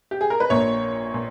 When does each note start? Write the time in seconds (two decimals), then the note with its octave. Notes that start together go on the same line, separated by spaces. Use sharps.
0.11 G4
0.21 G#4
0.30 A#4
0.40 B4
0.50 A#1 A#2 A#3 C#5
1.14 A#2